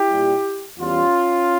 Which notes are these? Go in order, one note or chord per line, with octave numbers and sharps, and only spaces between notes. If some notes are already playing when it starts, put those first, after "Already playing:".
Already playing: E4 G4
A#2 G3
E2 E3 G3 C#4 F4